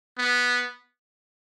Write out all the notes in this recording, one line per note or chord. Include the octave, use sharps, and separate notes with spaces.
B3